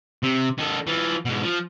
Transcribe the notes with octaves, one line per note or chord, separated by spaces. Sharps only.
C3
D#3 A4
E3 F4
G#2 B2
F3